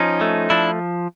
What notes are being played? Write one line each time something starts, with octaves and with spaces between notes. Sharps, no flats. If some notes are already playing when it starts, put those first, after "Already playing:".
Already playing: F3 C#4 D#4
A3
F3 D4 E4